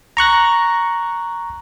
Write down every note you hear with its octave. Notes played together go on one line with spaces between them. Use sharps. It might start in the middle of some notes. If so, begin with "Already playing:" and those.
A#5 C#6 F#6 A#6